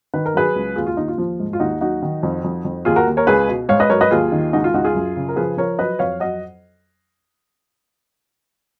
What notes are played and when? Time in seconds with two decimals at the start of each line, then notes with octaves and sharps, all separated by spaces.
0.14 D#3 B4
0.26 A#4
0.34 F#3 G#4 B4
0.56 C#2
0.76 D#2 F4 G#4
0.87 F4
0.97 D#2 D#4
1.08 F4
1.18 F3
1.40 G#2
1.53 F4
1.59 D#2 D#4 F#4
1.81 F#3 D#4 F#4
2.02 D#3
2.23 F2
2.44 F2
2.65 F2
2.85 D#2 F4 G#4
2.96 F#4 A#4
3.07 D#2
3.17 A#4 C#5
3.27 C#2 G#4 B4
3.48 B2
3.69 G#2 C#5 F5
3.80 B4 D#5
3.90 F#3 A#4 C#5
4.01 B4 D#5
4.11 D#2 F4 G#4
4.32 D#3
4.53 C#2 D#4 F#4
4.64 F4
4.74 C#2 D#4 F#4
4.84 F4 G#4
4.94 F#2
5.16 C#3
5.29 A#4
5.36 F3 G#4 B4
5.57 F3 A#4 C#5
5.79 F#3 B4 D#5
5.99 F2 C#5 F5
6.20 F#3 D#5 F#5